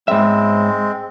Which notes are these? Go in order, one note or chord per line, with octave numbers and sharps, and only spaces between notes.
G#2 G#3 C4 E5